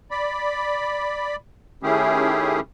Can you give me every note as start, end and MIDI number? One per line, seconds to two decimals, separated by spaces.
0.11 1.36 74
0.11 1.36 83
1.83 2.60 51
1.83 2.60 57
1.83 2.60 61
1.83 2.60 64
1.83 2.60 67
1.83 2.60 68